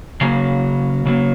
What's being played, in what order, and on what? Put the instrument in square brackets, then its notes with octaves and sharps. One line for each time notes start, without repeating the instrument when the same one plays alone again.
[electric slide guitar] C#3 F#3 A#3 F5 G#5
C#3 F#3 A#3